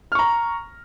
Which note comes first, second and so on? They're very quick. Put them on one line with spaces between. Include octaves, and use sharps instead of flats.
F6 C#6 A#5